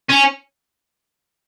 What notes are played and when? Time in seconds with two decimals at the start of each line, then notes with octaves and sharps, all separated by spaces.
0.10 C#4